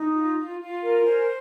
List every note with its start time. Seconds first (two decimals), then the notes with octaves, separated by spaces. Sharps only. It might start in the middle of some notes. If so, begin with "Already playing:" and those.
Already playing: D#4
0.15 F4
0.37 F4
0.60 F4
0.83 A#4
1.05 C5 G#5